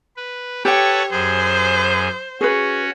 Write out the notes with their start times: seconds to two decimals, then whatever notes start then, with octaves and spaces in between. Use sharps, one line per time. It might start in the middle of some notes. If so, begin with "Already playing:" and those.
0.16 B4
0.65 G4 A4 B4 C#5 F#5 G5
1.12 F#2 G#4 C5
2.41 C#4 F#4 G#4 B4